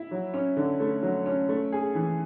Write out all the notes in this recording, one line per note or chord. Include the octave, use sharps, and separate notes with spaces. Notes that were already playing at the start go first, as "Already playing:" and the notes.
Already playing: E4
F#3
C#4
D3
A3
F#3
C#4
A3
G#4
E3